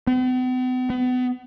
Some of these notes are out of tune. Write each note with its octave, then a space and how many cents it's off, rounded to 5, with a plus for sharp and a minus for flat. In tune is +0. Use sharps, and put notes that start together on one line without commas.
B3 +45
B3 +35